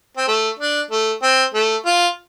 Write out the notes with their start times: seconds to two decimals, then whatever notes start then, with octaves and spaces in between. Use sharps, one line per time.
0.17 C4
0.28 A3
0.59 D4
0.91 A3
1.22 C4
1.54 A3
1.85 F4